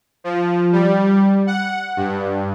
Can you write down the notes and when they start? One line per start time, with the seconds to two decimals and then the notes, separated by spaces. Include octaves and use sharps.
0.24 F3
0.72 G3
1.47 F#5
1.97 G2